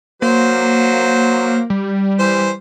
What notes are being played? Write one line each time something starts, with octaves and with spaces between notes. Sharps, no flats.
F#3 A#3 C5
G3
E3 C5